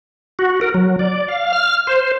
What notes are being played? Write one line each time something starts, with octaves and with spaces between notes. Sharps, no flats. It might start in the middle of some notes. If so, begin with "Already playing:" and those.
F#4
A#4
F#3
D5
F5
F6
C5